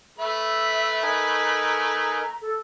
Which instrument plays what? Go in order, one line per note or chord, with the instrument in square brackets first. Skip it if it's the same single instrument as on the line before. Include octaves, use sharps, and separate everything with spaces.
[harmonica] A3 B4 B5 [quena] E5
[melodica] D#4 A#4 G#5
[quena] A#5
A4